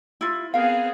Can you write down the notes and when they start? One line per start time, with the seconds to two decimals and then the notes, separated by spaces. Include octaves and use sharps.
0.21 E4 F4
0.54 B3 C4 G#4 A#4 F5